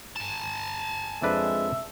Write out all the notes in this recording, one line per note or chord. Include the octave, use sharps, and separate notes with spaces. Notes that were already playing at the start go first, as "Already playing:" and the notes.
G#5 A5
F2 G#3 D4 B4 E5